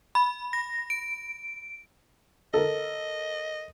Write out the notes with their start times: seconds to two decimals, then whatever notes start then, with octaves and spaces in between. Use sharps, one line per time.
0.15 B5
0.53 A#6
0.90 D7
2.54 A4 A#4 D#5